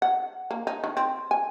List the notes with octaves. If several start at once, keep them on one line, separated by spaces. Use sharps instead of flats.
F#5
A#3
D#4
D#3
C4
G#5